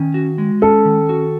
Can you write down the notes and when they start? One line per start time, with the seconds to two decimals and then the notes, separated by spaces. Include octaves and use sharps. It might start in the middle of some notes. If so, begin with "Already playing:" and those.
Already playing: D#3 C#4
0.14 F#4
0.38 G#3
0.62 C#4 A4
0.85 D#3
1.09 F#4